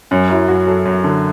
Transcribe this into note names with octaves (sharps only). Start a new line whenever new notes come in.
F#2 C#4
F#3 E4
F#2 F#4
F#3 A4
F#2
D3